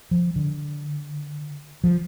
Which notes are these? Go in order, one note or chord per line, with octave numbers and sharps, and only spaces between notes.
F3
D3
F3